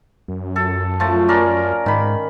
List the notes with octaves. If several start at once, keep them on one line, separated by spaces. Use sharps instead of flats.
F#2
A4
F3 A3 A5
C#4 A#4 D5
G#2 D#3 B5